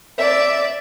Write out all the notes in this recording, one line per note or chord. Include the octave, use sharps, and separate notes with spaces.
D5 E5